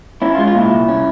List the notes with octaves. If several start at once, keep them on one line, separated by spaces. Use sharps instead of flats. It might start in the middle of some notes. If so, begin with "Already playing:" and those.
C#4 E4
G#3 F4
F4
A#2 E4
C2
C#4